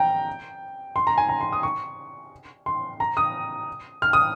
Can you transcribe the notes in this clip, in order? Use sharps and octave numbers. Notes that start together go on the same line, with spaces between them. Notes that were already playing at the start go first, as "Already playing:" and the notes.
Already playing: G5 A#5
C6
A#5
G#5
A#5
C6
D#6
C#6
C6
A#5
D#6
F6
D#6